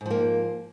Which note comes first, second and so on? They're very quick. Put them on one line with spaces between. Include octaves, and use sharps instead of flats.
G#2 F3 A#3